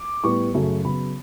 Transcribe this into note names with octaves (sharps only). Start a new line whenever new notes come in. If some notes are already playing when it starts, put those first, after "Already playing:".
Already playing: D6
A2 G3 B3 C#6
F#2 C#3 F#3 A3
C#3 F#3 B3 B5